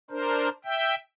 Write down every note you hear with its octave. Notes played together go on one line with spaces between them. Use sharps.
D4 A#4 C5
E5 G5